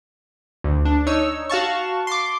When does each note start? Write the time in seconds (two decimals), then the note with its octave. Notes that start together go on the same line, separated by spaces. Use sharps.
0.64 D2
0.85 D4
1.07 D#4 C#5 E6
1.49 F#4 F5 A5 C#6
2.07 C6 D6